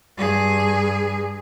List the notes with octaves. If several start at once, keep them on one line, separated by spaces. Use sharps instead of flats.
G2 G#4